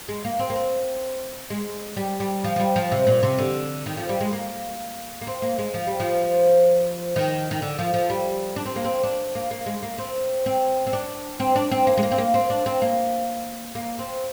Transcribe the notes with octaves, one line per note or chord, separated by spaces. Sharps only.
G#3
A#3
C4
A#3
C4
G#3
G3
G3
F3
F3
G3
F3
C3
A#2
C3
D3
D#3
F3
G3
G#3
A#3
A#3
C4
A#3
G#3
F3
G3
F3
D#3
D#3
D3
F3
F3
G3
D4
C4
A#3
C4
D4
A#3
A#3
G#3
A#3
C4
C4
C4
D4
C4
D4
C4
A#3
G#3
A#3
C4
A#3
C4
D4
C4
A#3
A#3
C4